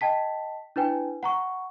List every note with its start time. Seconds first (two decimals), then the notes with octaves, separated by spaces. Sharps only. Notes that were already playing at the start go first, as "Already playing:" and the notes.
0.01 D#5 G5 A5 B6
0.76 D4 E4 B4 G5 G#5
1.23 F#5 A#5 C#6